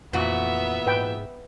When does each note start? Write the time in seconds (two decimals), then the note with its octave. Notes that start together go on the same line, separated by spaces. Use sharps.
0.13 F2 A#2 E3 B3 F#4 E5
0.87 G#2 B4 G5